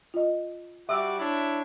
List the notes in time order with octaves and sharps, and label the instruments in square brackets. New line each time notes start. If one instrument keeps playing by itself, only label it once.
[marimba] F4 D#5
[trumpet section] G3 F#4 D6 [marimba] E5 E6
[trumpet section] D4 E4 C#5